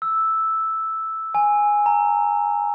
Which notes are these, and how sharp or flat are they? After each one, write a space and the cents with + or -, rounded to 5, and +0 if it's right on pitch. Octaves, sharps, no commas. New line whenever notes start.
E6 -5
G#5 -5
A#5 -20